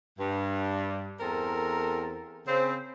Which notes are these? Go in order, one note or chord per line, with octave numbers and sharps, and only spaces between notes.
G2
E2 C4 A4 A#4
C#3 C4